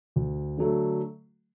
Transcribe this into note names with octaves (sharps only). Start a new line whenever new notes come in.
D2
D3 F#3 A3